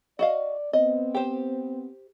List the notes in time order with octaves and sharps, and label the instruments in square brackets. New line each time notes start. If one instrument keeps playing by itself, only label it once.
[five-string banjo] F#4 D#5 F5 [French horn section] D5
[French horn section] B3 C4 [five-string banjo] D#5
[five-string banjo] G4 C5